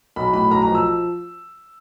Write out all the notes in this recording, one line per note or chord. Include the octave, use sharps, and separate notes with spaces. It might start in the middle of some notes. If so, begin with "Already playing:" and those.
B1 B5
A2 B5
B1 A#5
A#5
F3
E6